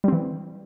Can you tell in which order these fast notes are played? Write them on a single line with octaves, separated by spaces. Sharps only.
G3 C4 E3